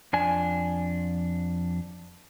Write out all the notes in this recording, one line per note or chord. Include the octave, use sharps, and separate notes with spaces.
F2 D4 G#5